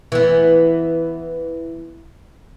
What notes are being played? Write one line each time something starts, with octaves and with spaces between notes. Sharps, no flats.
E3 B3